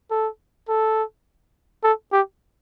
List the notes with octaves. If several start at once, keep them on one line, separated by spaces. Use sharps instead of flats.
A4
A4
A4
G4